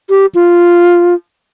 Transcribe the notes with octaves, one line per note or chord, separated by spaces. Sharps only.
G4
F4